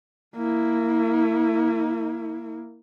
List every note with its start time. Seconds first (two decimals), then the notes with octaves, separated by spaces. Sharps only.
0.36 A#3 E4